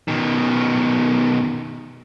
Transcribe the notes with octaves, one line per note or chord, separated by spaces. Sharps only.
B2 D#3